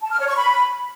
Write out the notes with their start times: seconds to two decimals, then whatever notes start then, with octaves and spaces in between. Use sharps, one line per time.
0.03 A5
0.11 F6
0.19 C#5
0.28 C#6
0.36 B5